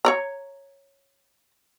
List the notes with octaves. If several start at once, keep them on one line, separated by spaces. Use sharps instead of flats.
C#5 D5 A#5